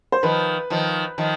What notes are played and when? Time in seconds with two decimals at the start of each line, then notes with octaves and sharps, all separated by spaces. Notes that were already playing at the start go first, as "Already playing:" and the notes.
0.12 C5
0.23 D#3 F3 B4
0.70 D#3 F3
1.18 D#3 F3